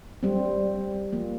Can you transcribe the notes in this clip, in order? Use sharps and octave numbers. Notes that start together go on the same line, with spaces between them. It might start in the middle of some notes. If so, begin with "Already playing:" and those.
G3 C4
F3 A#3